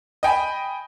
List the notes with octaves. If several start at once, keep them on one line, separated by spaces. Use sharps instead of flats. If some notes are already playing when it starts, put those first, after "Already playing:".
D#5 G5 G#5 B5